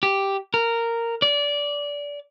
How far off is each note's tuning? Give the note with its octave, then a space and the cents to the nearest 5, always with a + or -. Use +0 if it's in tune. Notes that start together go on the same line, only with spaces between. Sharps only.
G4 +0
A#4 -10
D5 -20